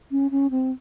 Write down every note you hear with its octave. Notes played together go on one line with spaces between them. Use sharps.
C#4
C#4
C4